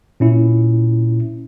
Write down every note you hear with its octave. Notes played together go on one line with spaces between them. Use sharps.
A#2 C#4 E4